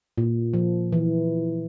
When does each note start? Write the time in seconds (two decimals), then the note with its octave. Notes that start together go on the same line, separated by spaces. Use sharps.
0.18 A#2
0.54 F3
0.92 E3